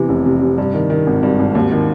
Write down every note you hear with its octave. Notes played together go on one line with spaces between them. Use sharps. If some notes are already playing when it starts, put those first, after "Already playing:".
Already playing: E2 C3 E3
F1
C3
C3
G2
D#3
D#3
G#1
G2
G#1
D#2
D#3